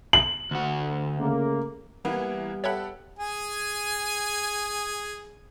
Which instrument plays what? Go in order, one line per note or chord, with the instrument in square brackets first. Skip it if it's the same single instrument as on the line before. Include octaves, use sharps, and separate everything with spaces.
[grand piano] F#7
[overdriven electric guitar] D2 F#4
[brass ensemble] C#3 A3 A#3
[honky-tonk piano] E3 A#3 [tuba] G3 [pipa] B3
[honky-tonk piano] G4 A4 F#5 [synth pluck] C#5 E5 B5
[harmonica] G#4 G#5